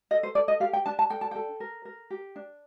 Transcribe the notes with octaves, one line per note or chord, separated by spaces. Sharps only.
A4 D#5
C5
A4 D5
D#5
G4 F5
G5
D4 A5
A5
A4 G5
A5
A4 G5
A#4
A#4
G4
D4